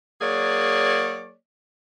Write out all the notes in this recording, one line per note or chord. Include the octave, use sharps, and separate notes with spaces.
F#3 A#3 G#4 C#5 D5